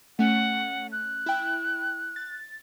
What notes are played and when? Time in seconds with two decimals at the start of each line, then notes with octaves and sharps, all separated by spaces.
0.19 A3 C#4 F#5
0.92 F#6
1.26 E4 G5
2.16 A6